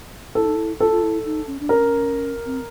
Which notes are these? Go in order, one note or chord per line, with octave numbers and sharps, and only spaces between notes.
E4 A4
D#4
E4
F4 A4
F4
E4
D#4
C#4
D4
C#4 A#4
C4